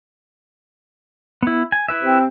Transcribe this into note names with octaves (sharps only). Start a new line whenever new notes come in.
B3 E4
G#5
E4 B4 E5
C3 C4